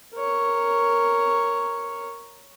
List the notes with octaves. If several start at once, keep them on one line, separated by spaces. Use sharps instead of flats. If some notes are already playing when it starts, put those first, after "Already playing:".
A#4 C#5